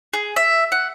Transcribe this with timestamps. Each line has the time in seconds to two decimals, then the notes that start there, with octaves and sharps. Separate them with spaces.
0.14 G#4
0.36 E5
0.72 F#5